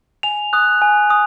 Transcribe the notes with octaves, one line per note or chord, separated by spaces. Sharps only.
G#5 F7
D#6 F#6
G#5
D#6